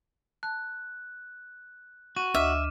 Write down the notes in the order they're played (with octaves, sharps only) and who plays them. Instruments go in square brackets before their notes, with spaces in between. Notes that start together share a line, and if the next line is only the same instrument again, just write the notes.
[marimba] A5 [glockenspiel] F#6
[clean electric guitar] F#4 [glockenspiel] D#7
[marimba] D2 D#5 [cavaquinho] E5 [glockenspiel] D6 F6 E7